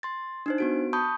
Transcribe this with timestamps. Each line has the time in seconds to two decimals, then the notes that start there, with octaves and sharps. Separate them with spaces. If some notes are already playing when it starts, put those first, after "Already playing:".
0.03 C6 A6
0.46 D4 D#4 C5
0.58 B3 F#4 D7
0.93 A5 B5 C#6 D#6 G6